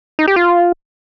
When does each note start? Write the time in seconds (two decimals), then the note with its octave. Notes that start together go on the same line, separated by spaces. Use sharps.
0.19 D#4
0.28 G4
0.36 F4